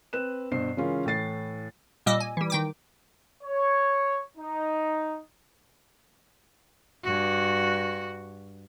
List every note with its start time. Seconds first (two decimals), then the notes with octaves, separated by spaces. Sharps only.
0.13 C4 B4 F#6 E7
0.52 G2 B2 C5 C7
0.77 C#3 E3 G#3 C#4 F4 A#4
1.06 A2 E3 A6 C7
2.06 A#2 G3 D#5 D6 E6
2.20 G#5
2.37 E3 G3
2.50 D#3 G5 D6
3.43 C#5
4.37 D#4
7.03 G2 F#4